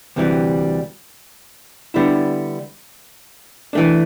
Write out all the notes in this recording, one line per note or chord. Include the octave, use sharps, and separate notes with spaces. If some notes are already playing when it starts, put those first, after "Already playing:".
D2 C3 E3 G3
D3 G3 B3 E4
E3 A3 D4